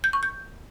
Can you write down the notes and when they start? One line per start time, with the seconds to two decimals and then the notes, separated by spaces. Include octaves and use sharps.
0.04 G6
0.13 C#6
0.23 G6